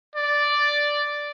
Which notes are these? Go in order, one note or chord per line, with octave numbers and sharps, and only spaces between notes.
D5